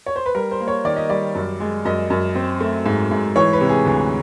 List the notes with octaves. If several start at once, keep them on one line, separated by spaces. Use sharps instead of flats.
C#5
C5
B4
G3 A#4
C5
A#3
C#5
D#3 D5
D#5
G3 D5
F#2
G#3
F#2 D#5
F#2
C4
A3
G#2
G#2
E3 C#5
B4
C3
G#4
D2